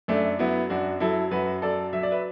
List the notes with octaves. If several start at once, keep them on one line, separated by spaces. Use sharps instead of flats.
F#2 A3 D4
F#3 B3 E4
F#2 D4 F#4
F#3 E4 A4
F#2 F#4 B4
F#3 A4 D5
F#3 E5
D5
B4 E5